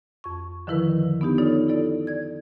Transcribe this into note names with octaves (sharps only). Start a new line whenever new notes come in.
F2 C#6
D3 D#3 F3 E4 A#4 B4
B3 D4 D#4 G4
D#4 F4 A4 C#5 D5
E4 A4 D5
D5 G#6